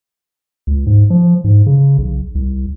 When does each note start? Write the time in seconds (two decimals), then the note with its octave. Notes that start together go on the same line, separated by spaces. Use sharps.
0.67 C#2
0.86 G#2
1.10 F3
1.44 G#2
1.67 C#3
1.98 B1
2.35 C2